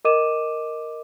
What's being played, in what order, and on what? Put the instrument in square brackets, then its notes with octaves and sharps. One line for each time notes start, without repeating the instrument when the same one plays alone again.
[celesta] A#4 D#5 D6 D#7 E7